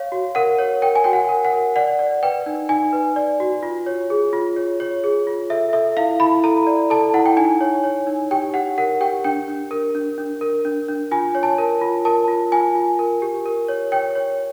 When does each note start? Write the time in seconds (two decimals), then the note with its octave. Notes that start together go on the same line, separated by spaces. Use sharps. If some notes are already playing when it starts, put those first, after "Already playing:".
Already playing: C#5 F5
0.12 F#4
0.35 A#4 F#5
0.59 C#5
0.82 A#4 G5
0.95 G#5
1.04 F#4 G5
1.13 F#5
1.29 A#4
1.45 F#5
1.52 A#4
1.76 D5 F#5
1.99 D5
2.23 B4 G5
2.46 D#4
2.69 D#4 G#5
2.93 B4
3.16 D5
3.40 F#4
3.63 F4
3.86 C#5
4.10 G#4
4.33 F4
4.56 C#5
4.80 C#5
5.04 G#4
5.27 F4
5.50 A4 E5
5.73 A4 E5
5.97 E4 F5
6.20 E4 B5
6.44 A4 A#5
6.67 D5
6.90 A4 A5
7.14 E4 F#5
7.26 G5
7.37 D#4 G#5
7.61 C#5
7.84 C#5
8.07 D#4
8.31 G4 G5
8.54 G4 F#5
8.78 A#4 F#5
9.01 G4 G5
9.24 D4 G5
9.48 D4
9.71 A#4
9.95 D4
10.18 D4
10.41 A#4
10.65 D4
10.88 D4
11.11 F4 G#5
11.35 C#5
11.43 A5
11.58 A#4
11.81 F4
12.05 A#4 A5
12.28 F4
12.52 F4 G#5
12.75 F4
12.99 A#4
13.22 G4
13.46 A#4
13.68 C#5
13.92 C#5 G5
14.15 C#5